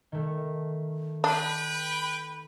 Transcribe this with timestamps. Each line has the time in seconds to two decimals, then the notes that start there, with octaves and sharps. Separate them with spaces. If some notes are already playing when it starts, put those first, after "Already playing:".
0.12 D#3 A3
1.24 D4 B4 G5 B5